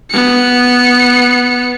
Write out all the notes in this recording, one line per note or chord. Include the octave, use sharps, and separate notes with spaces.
B3 C#7